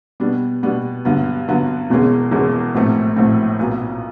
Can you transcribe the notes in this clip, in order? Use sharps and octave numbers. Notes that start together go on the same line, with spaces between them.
B2 G3 B3 D4
B2 G3 B3 D4
G2 D3 F#3 B3
G2 D3 F#3 B3
E1 E2 B2 G#3 C#4
E1 E2 B2 G#3 C#4
A#1 A2 F#3 A3 C4
A#1 A2 F#3 A3 C4
B1 A#2 F#3 B3